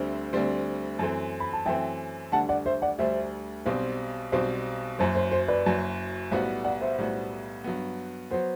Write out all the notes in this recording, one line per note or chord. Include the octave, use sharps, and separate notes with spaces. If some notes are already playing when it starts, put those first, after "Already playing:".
Already playing: D2 D3 G3 C4 C5 E5
D2 D3 G3 C4
F#2 E3 A3 C4
B5
A5
F#2 E3 A3 C4 E5 G5
D2 D3 G3 D4 F#5 A5
D5 F#5
C5 E5
D5 F#5
D2 D3 G3 D4 C5 E5
B1 B2 G3 C4 C5
B1 B2 G3 C4 C5
F#1 F#2 F#3 C5
C5
C5
B4 D5
F#1 F#2 F#3
B1 A2 G3 B3 F#4 C5
D5 F#5
C5 E5
B1 A2 G3 B3 F#4
G2 F#3 B3
F#3 B3 C5